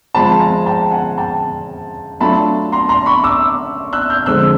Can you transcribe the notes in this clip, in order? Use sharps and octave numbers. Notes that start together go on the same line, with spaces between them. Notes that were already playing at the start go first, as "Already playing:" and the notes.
F3 G#3 C4 F4 A5 B5
G#5 A#5
G5 A5
F#5 G#5
G5 A5
F#3 A3 D4 F4 A5 B5
A#5 C6
A#5 C6
B5 C#6
D6 E6
E6 F#6
F6 G6
D3 F3 G#3 C4 E6 F#6